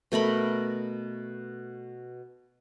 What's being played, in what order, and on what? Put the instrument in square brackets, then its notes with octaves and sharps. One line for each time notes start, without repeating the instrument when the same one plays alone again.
[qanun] B2 A3 A#4 B5